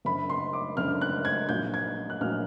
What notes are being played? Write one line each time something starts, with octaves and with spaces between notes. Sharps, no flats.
F#1 F#2 D3 B5
C6
D6
F#1 F#2 D3 F6
F#6
G#6
A#1 A#2 F#3 G6
G#6
F#6
A#1 A#2 F#3 F6